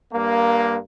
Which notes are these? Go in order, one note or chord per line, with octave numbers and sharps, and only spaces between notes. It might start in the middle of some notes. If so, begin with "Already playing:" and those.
G2 A#3